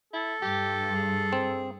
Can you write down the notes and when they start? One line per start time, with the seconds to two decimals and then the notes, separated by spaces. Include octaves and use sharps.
0.13 E4 A4
0.42 G2 G4
0.95 G#4
1.33 C4